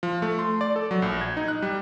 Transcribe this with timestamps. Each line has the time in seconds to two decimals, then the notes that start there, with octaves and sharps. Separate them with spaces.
0.03 F3
0.22 A3
0.39 C6
0.61 D5
0.76 A4
0.91 F#3
1.02 A#1
1.21 G#6
1.37 D#4
1.48 F#6
1.62 G3